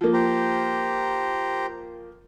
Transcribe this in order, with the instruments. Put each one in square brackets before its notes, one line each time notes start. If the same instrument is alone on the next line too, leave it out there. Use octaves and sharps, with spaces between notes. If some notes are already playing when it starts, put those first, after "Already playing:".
[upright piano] F3 A#3
[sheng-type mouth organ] G4 C5 A#5